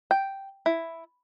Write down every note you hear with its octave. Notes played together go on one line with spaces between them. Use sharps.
G5
E4